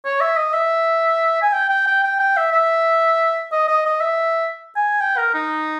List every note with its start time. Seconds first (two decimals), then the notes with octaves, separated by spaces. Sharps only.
0.05 C#5
0.21 E5
0.37 D#5
0.54 E5
1.42 G#5
1.53 G5
1.69 G5
1.87 G5
2.04 G5
2.20 G5
2.37 E5
2.52 E5
3.52 D#5
3.68 D#5
3.86 D#5
4.01 E5
4.76 G#5
5.01 G5
5.17 A#4
5.34 D#4